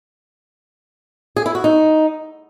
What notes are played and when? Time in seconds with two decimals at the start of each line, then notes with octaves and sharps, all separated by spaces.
1.36 G#4
1.46 E4
1.55 F#4
1.64 D#4